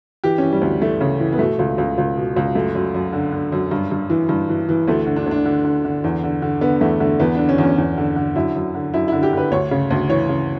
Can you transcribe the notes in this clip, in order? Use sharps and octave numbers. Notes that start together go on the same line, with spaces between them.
E3 G4
E3 C#4
G3
D2
E3 A3
C#3
E3
B3
B2 A3
C#2
C#2
C#2
B2
C#2
F#2 A3
F#2
F#2
D3
D3
F#2
G2
G2
E3
G2
E3
E3
D2 A3
D3
D4
D2
D4
D3
D3
D3
E2
D3
D3
D3 B3
E2 A3
D3 A3
E2 B3
D3 D4
C#4
E2
C#4
E2
D3
D3
F#2 E4
F#2
D3
F#2 E4
D3 E4
G4
D3 B4
D2 C#5
C#3
D2
E3 C#5
C#3